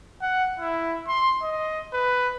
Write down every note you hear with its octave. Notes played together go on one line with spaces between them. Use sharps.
F#5
E4
C6
D#5
B4